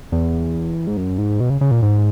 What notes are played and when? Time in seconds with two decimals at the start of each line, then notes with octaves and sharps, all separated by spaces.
0.12 E2
0.87 G#2
0.97 F#2
1.18 G#2
1.40 B2
1.50 C#3
1.61 C#3
1.71 A#2
1.82 G#2